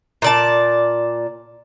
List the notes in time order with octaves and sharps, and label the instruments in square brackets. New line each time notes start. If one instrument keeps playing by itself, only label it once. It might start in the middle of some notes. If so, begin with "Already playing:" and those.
[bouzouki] A#2 D5 A5